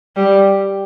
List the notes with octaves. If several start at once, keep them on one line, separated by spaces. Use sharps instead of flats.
G3